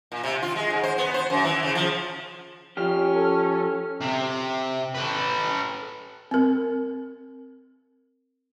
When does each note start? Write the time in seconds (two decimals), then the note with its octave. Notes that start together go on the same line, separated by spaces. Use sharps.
0.12 A#2
0.23 C3
0.42 F4
0.56 G#3
0.70 G#2
0.83 C5
0.98 B3
1.14 C5
1.30 F#2
1.44 E3
1.63 C#3
1.75 F3
2.77 F3 C#4 G4 F6
3.15 A4
4.01 C3
4.95 A4 B4
6.31 C4 A#4